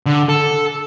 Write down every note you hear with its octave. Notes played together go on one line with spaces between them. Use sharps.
D3
A4